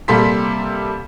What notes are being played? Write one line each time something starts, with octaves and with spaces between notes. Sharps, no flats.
C3 G3 A#3 A4 C6 B6